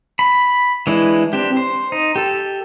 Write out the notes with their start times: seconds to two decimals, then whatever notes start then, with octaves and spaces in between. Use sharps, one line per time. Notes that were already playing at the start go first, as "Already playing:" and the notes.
0.19 B5
0.87 E3 G#3 D4 E4
1.33 C4 D4 G4
1.57 C5
1.92 D#4
2.16 G4 A4